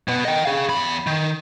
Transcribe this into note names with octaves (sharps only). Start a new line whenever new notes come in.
B2 B3
D#5 G5
G#4 F5
E2 B5
D#3